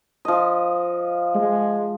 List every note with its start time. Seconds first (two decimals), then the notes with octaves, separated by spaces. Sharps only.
0.25 F3 D#5
1.35 G#3